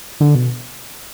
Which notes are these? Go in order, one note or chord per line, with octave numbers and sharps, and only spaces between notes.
D3
B2